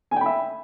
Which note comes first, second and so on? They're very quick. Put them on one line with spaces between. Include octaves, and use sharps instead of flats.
G#5 G5 B5 E5